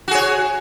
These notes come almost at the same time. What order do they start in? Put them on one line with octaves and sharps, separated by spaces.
F#4 G#4 C#5